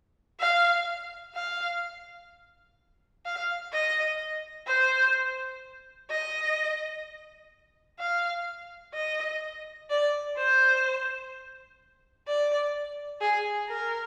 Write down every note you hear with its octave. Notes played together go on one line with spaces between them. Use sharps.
F5
F5
F5
D#5
C5
D#5
F5
D#5
D5
C5
D5
G#4
A#4